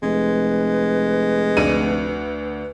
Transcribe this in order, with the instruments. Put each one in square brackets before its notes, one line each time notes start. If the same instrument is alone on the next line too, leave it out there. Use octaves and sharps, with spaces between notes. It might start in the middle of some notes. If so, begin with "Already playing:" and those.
[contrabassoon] F1 [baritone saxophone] G#3 [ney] B4
[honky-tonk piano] D2 D4 D#7